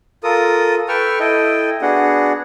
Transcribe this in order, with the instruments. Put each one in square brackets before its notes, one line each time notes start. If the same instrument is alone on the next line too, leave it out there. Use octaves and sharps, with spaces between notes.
[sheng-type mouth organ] F4 A4 A#4 D#6
A4 B4 G5 C#6 E6 F6
E4 A4 D#5 G5
B3 D4 F#4 G#4 F#5